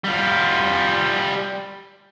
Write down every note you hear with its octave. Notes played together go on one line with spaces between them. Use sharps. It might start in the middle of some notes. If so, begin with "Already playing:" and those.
G3 F4